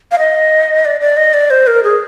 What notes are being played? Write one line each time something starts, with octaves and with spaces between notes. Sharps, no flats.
F5
D#5
D5
D5
D#5
D5
C5
A#4
G#4